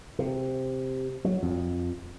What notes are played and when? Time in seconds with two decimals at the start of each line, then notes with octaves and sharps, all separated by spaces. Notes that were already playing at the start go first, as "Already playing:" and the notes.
0.19 C3
1.25 F#3
1.42 F2